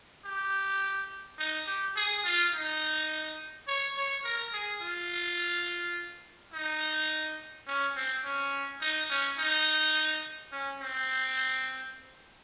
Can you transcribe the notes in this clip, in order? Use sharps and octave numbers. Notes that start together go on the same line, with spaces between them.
G4
D#4
G4
G#4
F4
D#4
C#5
C#5
A#4
G#4
F4
D#4
C#4
C4
C#4
D#4
C#4
D#4
C#4
C4